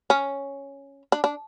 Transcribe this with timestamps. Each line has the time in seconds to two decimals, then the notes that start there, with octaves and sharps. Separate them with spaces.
0.10 C#4
1.12 D4
1.24 D4